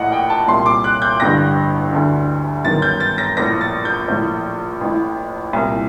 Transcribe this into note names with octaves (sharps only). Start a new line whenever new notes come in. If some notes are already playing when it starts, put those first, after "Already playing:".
Already playing: A#1 A2 D#5 F#5
G5
A5
C2 A#2 C6
D6
F#6
G6
A1 G2 D3 A#6
D2 D3
G1 F#2 D#3 A6
G6
A6
A#6
A#1 A2 A#6
A6
G6
A#1 A2
A1 A2
C2 A#2